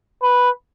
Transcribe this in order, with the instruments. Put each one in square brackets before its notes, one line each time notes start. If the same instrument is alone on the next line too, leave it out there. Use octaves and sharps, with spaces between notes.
[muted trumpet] B4